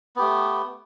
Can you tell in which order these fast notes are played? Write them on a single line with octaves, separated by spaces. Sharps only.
B3 G4 A3